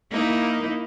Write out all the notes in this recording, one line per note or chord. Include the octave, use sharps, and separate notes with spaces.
A#3 D#4 E4